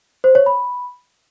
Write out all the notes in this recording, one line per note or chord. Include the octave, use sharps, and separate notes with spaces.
C5
C#5
B5